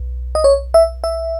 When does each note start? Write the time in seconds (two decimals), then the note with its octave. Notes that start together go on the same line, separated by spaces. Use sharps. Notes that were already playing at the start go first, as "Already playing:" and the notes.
Already playing: B1
0.35 D#5
0.44 C#5
0.74 E5
1.04 E5